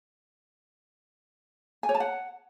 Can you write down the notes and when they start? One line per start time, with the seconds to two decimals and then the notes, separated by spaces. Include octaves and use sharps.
1.83 G#5
1.89 C#5
1.95 A5
2.00 F#5